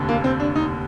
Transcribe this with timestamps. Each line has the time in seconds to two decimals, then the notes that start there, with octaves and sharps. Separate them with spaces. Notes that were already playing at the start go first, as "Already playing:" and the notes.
Already playing: F1 D#2 D3
0.09 A#3
0.24 C4
0.40 D4
0.55 D#4